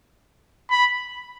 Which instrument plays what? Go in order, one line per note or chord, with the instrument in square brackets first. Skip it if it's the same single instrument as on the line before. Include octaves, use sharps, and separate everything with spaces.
[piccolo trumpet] B5